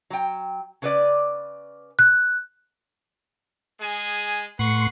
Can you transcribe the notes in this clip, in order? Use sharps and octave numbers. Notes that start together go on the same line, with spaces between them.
F#3 G5
C#3 B4 D5
F#6
G#3 G#4 G#5
A2 B4 F#5 C6 C#6